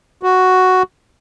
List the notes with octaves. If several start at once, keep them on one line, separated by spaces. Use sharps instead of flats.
F#4